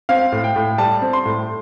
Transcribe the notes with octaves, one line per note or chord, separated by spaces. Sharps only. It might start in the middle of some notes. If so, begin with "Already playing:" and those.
C4 F5
A2
G5
A2
G3 A5
C4
C6
A2